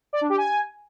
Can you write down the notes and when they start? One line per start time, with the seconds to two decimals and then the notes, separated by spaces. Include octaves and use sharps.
0.13 D5
0.21 D4
0.30 G4
0.38 G#5